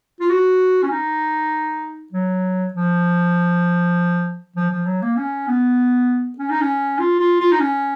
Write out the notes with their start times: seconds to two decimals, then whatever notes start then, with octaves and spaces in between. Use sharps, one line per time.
0.21 F4
0.30 F#4
0.83 C#4
0.91 D#4
2.12 F#3
2.74 F3
4.56 F3
4.71 F3
4.86 F#3
5.02 A#3
5.17 C#4
5.48 B3
6.38 C#4
6.50 D#4
6.62 C#4
6.99 F4
7.19 F4
7.40 F4
7.52 D#4
7.60 C#4